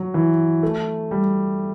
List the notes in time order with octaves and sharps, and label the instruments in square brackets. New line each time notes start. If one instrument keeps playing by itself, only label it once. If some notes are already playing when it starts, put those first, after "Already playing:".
Already playing: [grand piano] F#3
E3
A3
G3